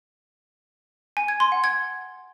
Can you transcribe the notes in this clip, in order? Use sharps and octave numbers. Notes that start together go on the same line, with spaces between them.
G#5
G#6
C6
F#5
G#6